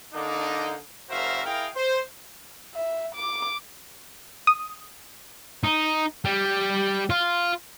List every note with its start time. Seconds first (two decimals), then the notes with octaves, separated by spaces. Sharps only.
0.14 D3 A#3 D4 D#4
1.10 F#1 F#4 A#4 C5 E5 F5
1.45 E4 G#4 A#4 F5 G5
1.76 C5
2.75 E5
3.15 D6
4.47 D#6
5.64 D#4
6.25 G3
7.10 F4